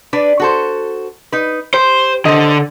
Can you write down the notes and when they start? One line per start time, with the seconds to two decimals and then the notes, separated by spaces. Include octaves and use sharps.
0.13 D4 B4 D5
0.40 F#4 A4 C5
1.32 D#4 B4
1.74 G4 C5
2.25 D3 C5 D#5